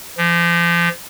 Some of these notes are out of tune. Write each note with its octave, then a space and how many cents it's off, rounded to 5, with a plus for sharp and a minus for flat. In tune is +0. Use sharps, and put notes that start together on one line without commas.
F3 -35